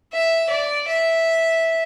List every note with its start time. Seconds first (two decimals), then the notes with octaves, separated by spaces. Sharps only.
0.12 E5
0.50 D5
0.88 E5